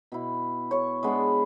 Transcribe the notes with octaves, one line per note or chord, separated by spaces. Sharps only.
B2 E4
C#5 C#6
G#3 B3 D4 E4